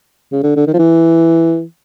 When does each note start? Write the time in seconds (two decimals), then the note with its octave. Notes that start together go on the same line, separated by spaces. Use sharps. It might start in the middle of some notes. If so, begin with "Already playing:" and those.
0.32 C#3
0.43 D3
0.56 D3
0.67 D#3
0.74 F3
0.79 E3